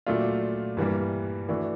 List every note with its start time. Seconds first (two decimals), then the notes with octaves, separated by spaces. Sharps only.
0.06 A#2 F#3 A3 D4 F4
0.77 G2 E3 G3 A#3
1.49 E3 A3 D4 F#4